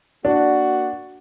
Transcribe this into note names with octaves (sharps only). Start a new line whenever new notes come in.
A#3 D4 F#4